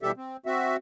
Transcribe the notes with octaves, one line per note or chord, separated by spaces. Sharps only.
B2 E3 G3 G4 A4 E5
C4
C4 F#4 E5